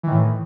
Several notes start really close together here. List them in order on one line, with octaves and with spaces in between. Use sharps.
E3 D#3 A2